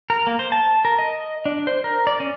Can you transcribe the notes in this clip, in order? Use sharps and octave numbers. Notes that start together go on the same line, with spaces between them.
A#4
A#3
C5
A5
A#4
D#5
D4
C5
A#4
D5
C#4